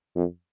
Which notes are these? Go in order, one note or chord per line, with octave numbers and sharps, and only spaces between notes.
F2